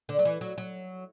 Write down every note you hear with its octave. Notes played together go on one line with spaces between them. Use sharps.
D3
F#3
E3
F#3
F#3